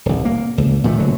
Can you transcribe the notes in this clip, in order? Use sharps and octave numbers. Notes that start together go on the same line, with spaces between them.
D#1 C2
A#3
C#2
A#2 D#3 F3 A3
F#1 D3 F#3